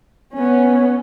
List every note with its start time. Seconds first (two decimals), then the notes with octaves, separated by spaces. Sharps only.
0.33 B3 C#4